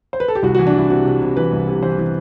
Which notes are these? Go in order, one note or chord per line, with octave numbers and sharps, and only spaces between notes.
C5
B4
A4
G4
C2 F#4
E3 F#4
D4
E3 E4
C3 F#4
C3
C3
E3 B4
C2
C3
E3 C5
E3